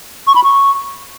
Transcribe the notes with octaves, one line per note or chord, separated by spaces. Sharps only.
C#6
B5
C#6